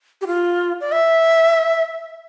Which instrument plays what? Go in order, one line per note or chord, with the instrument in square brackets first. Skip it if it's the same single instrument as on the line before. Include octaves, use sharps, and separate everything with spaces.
[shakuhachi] G4
F4
D5
E5